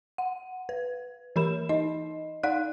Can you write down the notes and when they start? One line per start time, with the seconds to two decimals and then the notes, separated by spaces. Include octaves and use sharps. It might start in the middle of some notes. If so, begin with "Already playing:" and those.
0.18 F#5
0.69 B4
1.36 E3 G4 A#4 B5 E7
1.69 D#4 D#5
2.43 D#4 D5 F5 F#5 F#6